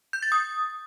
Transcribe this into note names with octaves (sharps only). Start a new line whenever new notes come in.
G6
A6
D#6